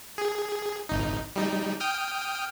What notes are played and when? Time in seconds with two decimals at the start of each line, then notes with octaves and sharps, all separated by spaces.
0.18 G#4
0.89 G#1 D#4
1.36 G3 D#4
1.80 G5 D#6 F6